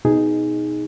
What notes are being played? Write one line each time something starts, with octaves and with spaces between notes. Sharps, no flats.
B2 D#4 G#4